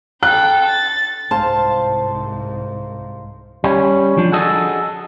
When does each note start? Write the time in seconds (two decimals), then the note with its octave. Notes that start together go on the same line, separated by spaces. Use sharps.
0.23 A4 G5 F#6
0.66 A6
1.31 C2 G#2 C5 F5 A5
3.64 G3 C#4
4.18 F3 D4
4.32 F#4 G#4 A4 D#5